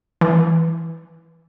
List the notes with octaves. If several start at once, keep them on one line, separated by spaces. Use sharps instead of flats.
E3